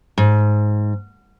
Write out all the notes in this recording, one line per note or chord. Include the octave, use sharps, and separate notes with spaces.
G#2